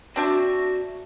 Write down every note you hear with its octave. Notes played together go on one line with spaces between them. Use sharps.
C4 D4 F#4 E5